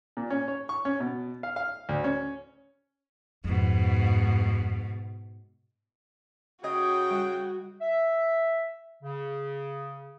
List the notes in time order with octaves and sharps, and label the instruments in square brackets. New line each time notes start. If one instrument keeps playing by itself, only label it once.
[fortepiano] A#2
C#4
C#5
C#6
C#4
B2
F5
F5
D2
C#4
[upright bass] F2 [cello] G#2 B2
[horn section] C#3 G5 [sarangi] F#4 [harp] D#5
[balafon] G3
[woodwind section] E5
C#3